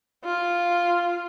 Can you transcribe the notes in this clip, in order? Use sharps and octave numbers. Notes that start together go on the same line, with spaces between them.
F4